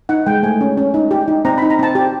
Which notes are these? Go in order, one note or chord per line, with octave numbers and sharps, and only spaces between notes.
D#4 F#5
G#3 G5
A3 G#5
C#4
C#4
D#4
G4
D#4
C4 A#5
D#4 B5
A#5
C4 A5
G4